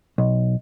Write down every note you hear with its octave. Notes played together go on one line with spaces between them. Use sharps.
B1